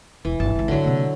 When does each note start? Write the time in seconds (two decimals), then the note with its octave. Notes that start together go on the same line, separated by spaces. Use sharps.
0.25 E1 E3
0.40 G1 A5
0.55 G#1 C#2
0.68 D3 F#3
0.84 C3 A#3